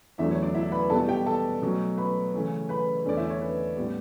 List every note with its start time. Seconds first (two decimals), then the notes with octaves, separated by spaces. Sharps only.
0.18 E2 D3 F#3 A3 E4 E5
0.31 C#5
0.42 D4 D5
0.55 E4 E5
0.72 B4 B5
0.90 B2 G3 B3 A4 A5
1.08 G4 G5
1.26 A4 A5
1.62 B2 F#3 A3 C#4
1.97 B4 B5
2.34 C#3 E3 A3 C#4
2.69 B4 B5
3.05 E2 D3 A3 C#4 D5
3.17 E4 E5
3.30 C#5
3.42 B4
3.76 A2 G3 B3